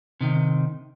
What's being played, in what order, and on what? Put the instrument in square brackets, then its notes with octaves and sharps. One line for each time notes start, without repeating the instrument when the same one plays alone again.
[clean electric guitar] C3 D#3